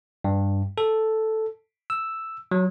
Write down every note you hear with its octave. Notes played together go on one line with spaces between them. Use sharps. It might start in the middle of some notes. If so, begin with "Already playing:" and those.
G2
A4
E6
F#3